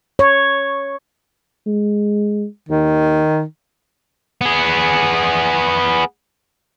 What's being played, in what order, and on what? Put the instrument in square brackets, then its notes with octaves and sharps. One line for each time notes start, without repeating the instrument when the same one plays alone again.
[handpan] C#5
[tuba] G#3
[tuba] D#2 [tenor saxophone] D#3
[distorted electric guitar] B3 G#4